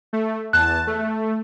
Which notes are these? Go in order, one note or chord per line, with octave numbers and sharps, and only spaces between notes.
A3
E2 A5 F#6
A3